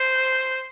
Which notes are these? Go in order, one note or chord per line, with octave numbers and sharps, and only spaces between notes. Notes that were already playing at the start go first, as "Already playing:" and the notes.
Already playing: C5